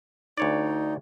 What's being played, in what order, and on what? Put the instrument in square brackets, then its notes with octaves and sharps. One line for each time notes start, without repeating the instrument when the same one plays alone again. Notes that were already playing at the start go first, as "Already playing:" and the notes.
[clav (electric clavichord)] D2 C#5 D5 [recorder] D#4